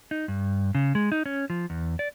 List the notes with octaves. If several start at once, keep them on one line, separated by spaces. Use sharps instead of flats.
D#4
G2
C#3
G#3
D#4
C#4
F3
E2
D5